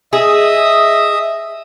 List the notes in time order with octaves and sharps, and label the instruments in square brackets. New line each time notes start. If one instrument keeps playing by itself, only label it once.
[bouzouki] G#4 [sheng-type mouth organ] D#5 E5 D#6